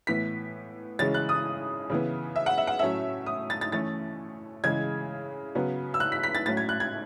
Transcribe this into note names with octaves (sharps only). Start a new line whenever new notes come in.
A2 E3 B3 B6
C#3 E3 G#3 C#4 A6
F#6
D#6
C#3 E3 B3
E5
F#5
E5
F#5
A2 F#3 A3 C#4 E5
D#6
A6
A6
E3 A3 C#4 A6
C#3 E3 G#3 G#6
C#3 F#3 B3
E6
F#6
B6
B6
A6
A2 F#3 C#4 A6
G#6
F#6
G#6